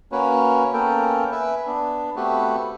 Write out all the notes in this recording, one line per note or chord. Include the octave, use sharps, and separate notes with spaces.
A#3 C#4 F#4 B4 C#5
A#3 B3 C#4 A4 A#4 G5
B4 E5 G#5
B3 D4
A3 B3 C4 F#4 G4 B4